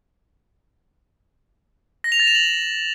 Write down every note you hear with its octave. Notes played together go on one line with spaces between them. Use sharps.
A#6
F7
A6
E7
F#7